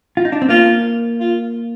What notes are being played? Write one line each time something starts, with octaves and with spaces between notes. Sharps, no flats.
F4
D#4
D4
C4
A#3 F4
F4